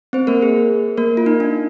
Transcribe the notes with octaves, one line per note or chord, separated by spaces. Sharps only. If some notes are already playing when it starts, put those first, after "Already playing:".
C4 C5
A#3 A#4
G#4
A#3 A#4
F4
D#4
D4